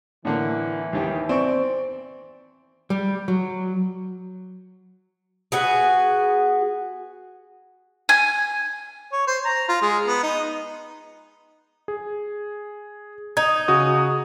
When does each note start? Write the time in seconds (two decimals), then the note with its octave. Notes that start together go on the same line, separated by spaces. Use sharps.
0.25 A2 D3 E3 A#3
0.93 D#2 D#3 G4
1.29 C4 D5 C#6
2.90 G3
3.28 F#3
5.52 B3 F#4 G#4
8.09 G#5
9.12 C#5
9.27 C5
9.45 A#5
9.69 F4
9.82 G#3
10.07 B3
10.23 D#4
11.88 G#4
13.37 D#4 G#6
13.68 C#3 F#4 D#6